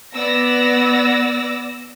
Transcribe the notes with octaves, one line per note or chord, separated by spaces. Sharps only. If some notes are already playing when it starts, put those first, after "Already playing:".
B3 D5 E6 A#6